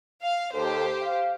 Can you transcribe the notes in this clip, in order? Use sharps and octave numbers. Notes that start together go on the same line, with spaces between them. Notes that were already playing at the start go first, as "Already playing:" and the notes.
F5
D#2 G4 A4 C5
F5